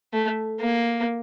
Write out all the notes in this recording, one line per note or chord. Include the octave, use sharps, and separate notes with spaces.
A3
A#3